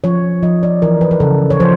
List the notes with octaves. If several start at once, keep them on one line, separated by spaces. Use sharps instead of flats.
F3 C#5
F3 D#5
D5
E3 A#4
B4
A#4
C#3 A4
C#5
F3 C5